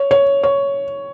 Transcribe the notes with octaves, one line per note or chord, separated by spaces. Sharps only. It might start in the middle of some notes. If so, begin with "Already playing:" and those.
Already playing: C#5
C#5
C#5